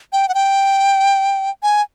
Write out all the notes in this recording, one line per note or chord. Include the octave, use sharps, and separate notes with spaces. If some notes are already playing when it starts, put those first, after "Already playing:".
G5
F#5
G5
G#5